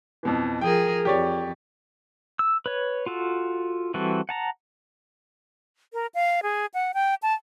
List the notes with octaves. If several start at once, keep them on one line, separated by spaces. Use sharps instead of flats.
F2 B2 E3
F3 G#4 A#4 G5
F2 G4 C#5 D5
E6
B4 C#5
F4 F#4 A4
E3 G3 C4 F#4 A4
F#5 A5 A#5
A#4
F5
G#4
F#5
G5
A5